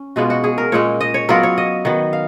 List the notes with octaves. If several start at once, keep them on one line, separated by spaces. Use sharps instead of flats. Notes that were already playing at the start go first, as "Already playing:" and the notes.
Already playing: C#4
B2 G#3 B3 F4 F#4
F#4
G#4
A#4
A#2 G#3 C#4 C#5
D#5
C#5
F#3 B3 F4 A#4
C#5
D#5
D#3 F#3 B3
F5